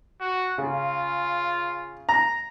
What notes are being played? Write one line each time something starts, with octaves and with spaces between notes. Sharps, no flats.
F#4
C#3 F4
A#5